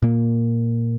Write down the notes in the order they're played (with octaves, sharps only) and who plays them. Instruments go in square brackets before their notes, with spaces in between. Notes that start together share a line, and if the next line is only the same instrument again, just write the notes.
[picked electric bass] A#2 A#3